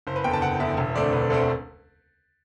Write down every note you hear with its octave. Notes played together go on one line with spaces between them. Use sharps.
F#1 C5
B4
E2 D3 G5
A5
F#1 F#5
E2 D3 E5
E1 E5
D2 D3 A3 C4 D5
E1 B4
D2 D3 A3 C4 A4